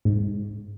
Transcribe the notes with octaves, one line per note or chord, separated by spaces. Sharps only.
G#2